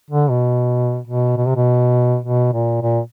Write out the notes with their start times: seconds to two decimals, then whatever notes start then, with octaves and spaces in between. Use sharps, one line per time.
0.10 D3
0.30 B2
1.07 B2
1.37 B2
1.46 C3
1.56 B2
2.24 B2
2.53 A#2
2.82 A#2